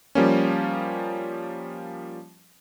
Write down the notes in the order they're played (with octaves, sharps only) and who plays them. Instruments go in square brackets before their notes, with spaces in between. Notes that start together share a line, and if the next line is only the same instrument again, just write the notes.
[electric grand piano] F3 G3 A#3 C#4